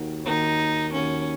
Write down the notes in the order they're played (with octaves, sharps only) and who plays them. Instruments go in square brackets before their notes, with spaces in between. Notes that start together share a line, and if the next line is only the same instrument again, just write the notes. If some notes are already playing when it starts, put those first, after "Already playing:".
Already playing: [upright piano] D#2 D#3 A#3 F#4
[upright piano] D#2 D#3 A#3 F#4 [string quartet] D#4
[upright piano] D#2 D#3 A#3 F#4 [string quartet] C#4